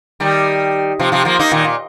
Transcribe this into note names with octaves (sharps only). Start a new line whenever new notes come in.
D#3 G3
C3 F3
C3 F3
F3 A#3
A#3 D#4
A#2 D#3
A#2